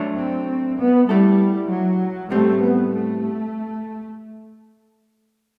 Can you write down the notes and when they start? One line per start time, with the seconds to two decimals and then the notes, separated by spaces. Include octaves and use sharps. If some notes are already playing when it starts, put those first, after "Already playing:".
Already playing: F#3 A3 D4
0.17 C4
0.78 B3
1.09 G3 A3 E4 A4
1.70 F#3
2.31 A2 G3 A3 C4
2.62 B3
2.93 A3